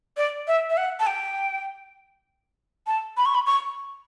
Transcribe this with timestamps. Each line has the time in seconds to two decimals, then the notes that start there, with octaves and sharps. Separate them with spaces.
0.17 D5
0.48 E5
0.70 E5
0.77 F#5
1.00 A5
1.07 G5
2.87 A5
3.17 B5
3.26 C#6
3.35 B5
3.46 C#6